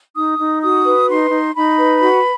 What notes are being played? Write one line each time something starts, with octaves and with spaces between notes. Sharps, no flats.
D#4 D#6
D#4
F#4 D#6
B4
D#4 C6
D#4
D#4 B5
B4
F#4